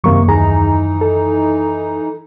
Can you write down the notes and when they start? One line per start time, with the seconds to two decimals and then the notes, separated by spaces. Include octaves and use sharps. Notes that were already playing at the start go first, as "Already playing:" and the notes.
0.04 F#2 C3 D#3 F#3 A#3 C#6
0.28 D#2 E3 D#4 G#4 A#5
1.01 A4